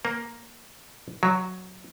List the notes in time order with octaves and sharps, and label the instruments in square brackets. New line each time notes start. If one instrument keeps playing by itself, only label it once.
[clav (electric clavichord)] A#3
F#3